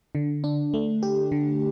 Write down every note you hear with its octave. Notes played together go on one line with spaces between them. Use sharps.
D3
D4
A3
G4
D3